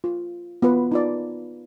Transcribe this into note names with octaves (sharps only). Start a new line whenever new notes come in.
F4
B3 F4 B4
D#4 F4 D5